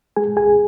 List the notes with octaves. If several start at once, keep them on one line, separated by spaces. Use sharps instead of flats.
G#3 G#4 G#5
C#2 G#4 G#5